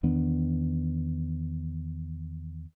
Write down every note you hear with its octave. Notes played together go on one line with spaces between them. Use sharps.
E2 D#3 B3 D4